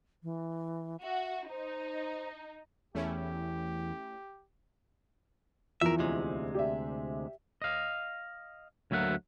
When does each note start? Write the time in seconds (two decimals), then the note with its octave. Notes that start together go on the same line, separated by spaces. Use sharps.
0.23 E3
1.03 F#4 E5
1.50 D#4 C5
2.95 E2 A3 C#4 E4 G4
5.81 E2 F3 E4 A#4 E5
5.99 D2 C3 G#3
6.54 G4 D5 E5
7.62 D#5 F5
8.91 D2 F#3 A#3 E5 F#5